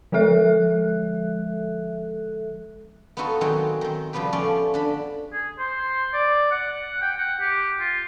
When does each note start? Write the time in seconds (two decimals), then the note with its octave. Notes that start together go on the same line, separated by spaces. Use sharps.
0.12 D3 F3 G#3 A4 E5 F#6
3.17 B3 D#4 F4 F#4 A4
3.41 D#3 F#3 G#3 C4 F#4 G#4
3.81 D#3 C4
4.13 C#3 F3 G3 B3 G4
4.32 F3 A3 C#4 D5
4.74 D3 D4 B5
5.33 G#4
5.59 C5
6.14 D5
6.52 F#5
7.02 G5
7.18 F#5
7.41 G4
7.80 F4